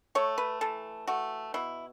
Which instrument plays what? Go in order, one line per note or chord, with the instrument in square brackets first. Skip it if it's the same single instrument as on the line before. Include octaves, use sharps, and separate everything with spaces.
[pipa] A3 C#5
B4
E3 A4
A3 F#4
B2 E4